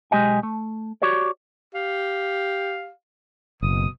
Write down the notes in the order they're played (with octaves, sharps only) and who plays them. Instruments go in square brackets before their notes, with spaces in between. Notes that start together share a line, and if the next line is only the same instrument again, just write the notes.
[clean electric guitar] B1 G#3 G4 D#5 G#5
A3
F#4 G4 C#5 D5
[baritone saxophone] G4 [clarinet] F5
[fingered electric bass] F#1 [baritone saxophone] B2 [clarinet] D#6